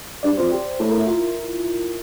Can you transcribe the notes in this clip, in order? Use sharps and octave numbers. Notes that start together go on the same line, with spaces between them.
G2 D5
F2 C5
G4
A2 A4
A#4
E4
F4